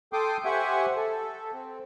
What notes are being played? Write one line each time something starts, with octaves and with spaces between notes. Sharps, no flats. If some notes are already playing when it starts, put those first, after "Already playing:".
A4 G5 C6 D6 D#6
G4 C5 E5 F#5 G#5 C#6
A4
C4